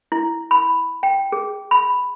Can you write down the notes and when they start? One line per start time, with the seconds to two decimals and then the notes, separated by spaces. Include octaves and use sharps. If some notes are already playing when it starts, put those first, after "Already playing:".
0.12 E4
0.51 B5
1.03 G5
1.32 G#4
1.71 B5